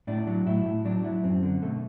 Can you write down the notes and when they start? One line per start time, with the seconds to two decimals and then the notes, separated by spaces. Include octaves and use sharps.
0.07 A2 D4
0.27 F#3
0.46 A2 E4
0.65 A2
0.85 F#3 D4
1.04 F#3 E4
1.24 F#2 C4
1.43 D3
1.62 B2 A3